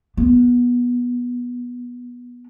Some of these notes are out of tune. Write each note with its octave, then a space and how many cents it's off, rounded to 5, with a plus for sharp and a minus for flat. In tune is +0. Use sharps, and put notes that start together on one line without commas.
B3 -15